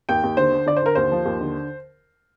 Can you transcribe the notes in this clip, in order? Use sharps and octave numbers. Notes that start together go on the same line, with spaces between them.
D#2 G5
D#2
D3 C5
D3
D3 D5
C5
D3 A#4
D#2 C5
F3
D#2
D3